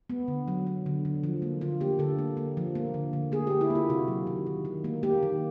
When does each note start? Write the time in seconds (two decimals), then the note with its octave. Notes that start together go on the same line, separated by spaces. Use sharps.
0.10 B3
0.28 D3
0.48 F#3
0.67 F#3
0.86 D3
1.05 D3
1.24 F3
1.42 A#3
1.61 D3 F4
1.81 A#3 G4
1.99 D3 A4
2.19 A#3
2.37 A#3
2.57 F3
2.75 A#3
2.94 D3
3.13 D3
3.32 A#3 G#4
3.47 A#3 G4
3.61 E4
3.70 A#3
3.75 F4
3.89 C3 F#4
4.08 F#3
4.27 D#3
4.47 D#3
4.65 D#3
4.84 A#3
5.03 A#3 G4
5.23 D#3